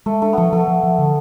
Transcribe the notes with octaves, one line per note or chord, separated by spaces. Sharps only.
G#3 A3
A3 D4
F3 A3 B3
F3 A3
F3
F3
D3